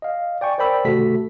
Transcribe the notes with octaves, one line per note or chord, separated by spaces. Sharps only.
D#5 F5
D5 G5 G#5 C#6
A#4 C5 D5 G5 B5 E6
G#1 C3 A3 F#4 A4 B6